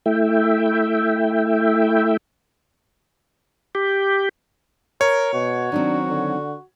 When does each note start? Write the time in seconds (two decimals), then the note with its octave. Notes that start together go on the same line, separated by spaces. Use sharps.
0.06 A3 E4 E5 G5
3.75 G4
5.01 A#4 C#5
5.33 B2 F#4
5.72 D#3 F#3 C4 D4
6.09 D3